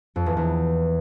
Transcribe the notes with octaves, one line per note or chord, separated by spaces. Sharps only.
F2
E2
E2